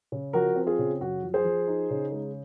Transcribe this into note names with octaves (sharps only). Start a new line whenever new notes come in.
C#3
F3 F#4 A#4
C4
F4 G#4
C#3
F#2 F#4
F3
G#4 C5
F3
D#4
C#3
G#3